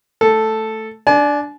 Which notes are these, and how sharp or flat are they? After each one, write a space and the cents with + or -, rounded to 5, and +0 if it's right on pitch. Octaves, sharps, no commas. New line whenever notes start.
A3 +0 A4 +0
D4 +0 G#5 +45